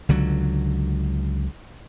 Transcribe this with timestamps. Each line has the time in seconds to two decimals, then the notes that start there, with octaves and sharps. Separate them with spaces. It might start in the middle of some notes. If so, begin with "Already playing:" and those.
0.09 C#2 D3 F#3